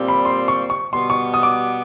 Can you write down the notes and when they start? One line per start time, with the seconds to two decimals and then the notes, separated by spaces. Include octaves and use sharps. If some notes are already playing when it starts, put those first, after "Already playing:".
Already playing: A#2 G3 C4
0.08 B5
0.25 C6
0.48 C#6
0.70 C#6
0.93 B2 G3 B3 C6
1.10 C#6
1.34 D#6
1.43 D6